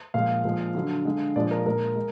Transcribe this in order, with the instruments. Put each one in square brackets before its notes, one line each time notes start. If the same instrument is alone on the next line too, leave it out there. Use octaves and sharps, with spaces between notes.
[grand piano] A#2 F3 G#3 F5
A#2 F3 G#3
D3 F#3
D3 G#3
A#2 F3 G#3 D5
A#4
A#2 G#3 A#4
G#3